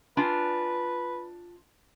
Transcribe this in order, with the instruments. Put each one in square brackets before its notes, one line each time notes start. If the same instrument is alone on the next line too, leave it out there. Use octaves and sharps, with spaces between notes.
[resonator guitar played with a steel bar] D4 F4 G#5 [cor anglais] B4